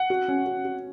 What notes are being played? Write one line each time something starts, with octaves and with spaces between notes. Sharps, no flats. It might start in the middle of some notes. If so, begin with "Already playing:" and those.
Already playing: F#5
F#4
C#4
F#4
F#4